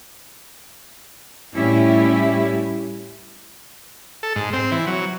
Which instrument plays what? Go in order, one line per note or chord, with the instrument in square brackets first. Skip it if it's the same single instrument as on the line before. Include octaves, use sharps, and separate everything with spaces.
[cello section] A2 G3 C#4 E4 G4
[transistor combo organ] A4
G#2
C4
E3
F#3